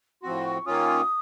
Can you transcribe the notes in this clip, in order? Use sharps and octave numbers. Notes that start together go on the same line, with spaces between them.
A2 F3 C4 F#4 C6
C#6
D#3 A#3 C#4 F4 D#6